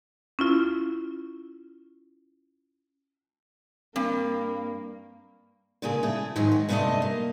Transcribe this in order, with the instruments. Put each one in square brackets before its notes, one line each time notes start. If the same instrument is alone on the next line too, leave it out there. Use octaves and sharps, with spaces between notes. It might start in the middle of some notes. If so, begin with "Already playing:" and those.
[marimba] C#4 E4 F4
[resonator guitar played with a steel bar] G2 [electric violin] A#3 [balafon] C4
[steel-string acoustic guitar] A#2 C#3 A#3 F4 G#4
C#3 A3 E4 G#4
G#2 D#3 F#3 C4 C#4 G#4
F#4
G2 C3 A3 C#4 F4 D#5
A#3